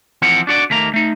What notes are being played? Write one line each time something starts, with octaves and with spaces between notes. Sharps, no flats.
E3 F3 C4 A#4 F#5
D4 F#4 D5
D#2 A3 A#3 A#5
A3 D#4